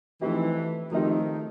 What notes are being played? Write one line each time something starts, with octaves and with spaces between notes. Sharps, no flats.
E3 F3 A3 C4 D#4 G4
D#3 F3 A3 C4 D#4 G4